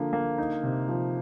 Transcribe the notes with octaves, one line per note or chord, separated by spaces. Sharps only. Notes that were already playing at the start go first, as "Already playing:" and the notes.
Already playing: D3 F3 A#3
A#3
D#4
C3
F3